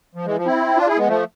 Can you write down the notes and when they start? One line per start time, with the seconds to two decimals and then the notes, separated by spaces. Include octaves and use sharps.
0.15 F3
0.25 E3 G#3
0.36 F3
0.46 C4 E4
0.77 D4 F4
0.87 E4 G#4
0.97 G#3 B3
1.08 F3 A3